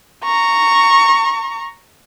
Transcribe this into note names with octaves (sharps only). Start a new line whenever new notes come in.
A#5 C#6